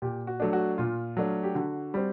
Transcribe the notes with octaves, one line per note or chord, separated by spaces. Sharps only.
A#2 G4
F#4
F#3 A3 D4
F#4
A#2 F4
F#3 A3 D4
G4
D3 F#4
G3 C4